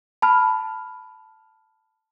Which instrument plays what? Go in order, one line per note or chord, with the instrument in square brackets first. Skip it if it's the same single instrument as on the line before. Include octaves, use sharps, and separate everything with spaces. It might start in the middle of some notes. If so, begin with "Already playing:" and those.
[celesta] A5 B5 F6